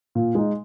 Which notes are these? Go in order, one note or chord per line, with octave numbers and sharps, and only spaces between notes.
A#2
G#3 D#4